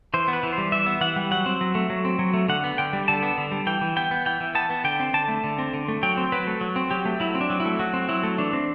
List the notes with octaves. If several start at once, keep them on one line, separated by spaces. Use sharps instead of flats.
E3 C5
B3
B4
E3
C5
G3
E3 E5
B3
E3 F#5
G3
F#3 F#5
C4
F#3
A3
F#3
C4
F#3
A3
D3 F#5
B3
D3 G5
G3
D3 A5
B3
D3
G3
E3 G5
E3
B3 G5
B3
E3 G5
E3
B3 A5
B3
D3 G5
C4
D3 A5
A3
D3
C4
D3
A3
F#3 G5
C4
F#3 B4
A3
F#3
C4
F#3 G4
A3
F#3 E4
C4
D4
F#3
E4
A3
F#3 F#4
C4
F#3 E4
A3
E3 D4
C4